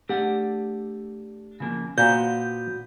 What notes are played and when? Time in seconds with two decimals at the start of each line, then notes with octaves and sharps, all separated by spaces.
0.09 A3 D4 G4 F#5
1.60 C#3 F3 A#3
1.98 A#2 B3 F#4 C5 G6